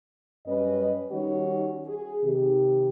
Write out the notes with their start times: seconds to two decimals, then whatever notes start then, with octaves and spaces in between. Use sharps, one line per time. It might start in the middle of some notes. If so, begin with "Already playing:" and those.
0.47 F#2 G3 C#4 B4 D#5
1.12 D#3 G3 C#4 D#4 F#4 C#5
1.87 G#4
2.24 C3 D#3 G4